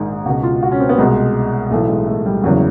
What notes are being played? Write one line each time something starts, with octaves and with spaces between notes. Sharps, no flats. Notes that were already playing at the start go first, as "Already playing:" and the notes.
Already playing: A#1 G#2 D#3
C#2 B2 F#4
F4
F#4
C#4
C4
B3
C2 B2 G#3
B1 A2 E3 A3
G#3
A3
G3
F#1 E2 C#3 E3 F#3